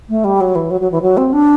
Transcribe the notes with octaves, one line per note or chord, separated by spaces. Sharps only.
A3
G3
F#3
E3
F#3
F#3
E3
F#3
C4
D4